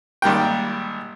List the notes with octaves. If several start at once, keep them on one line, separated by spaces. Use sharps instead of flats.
G#1 G3 A#3 G5